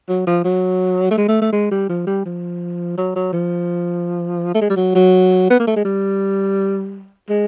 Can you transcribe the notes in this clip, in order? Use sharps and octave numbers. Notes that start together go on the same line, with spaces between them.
F#3
F3
F#3
A3
G#3
A3
A3
G#3
G3
F3
G3
F3
F#3
F#3
F3
A3
G#3
G3
F#3
F#3
B3
A#3
A3
G#3
G3
G#3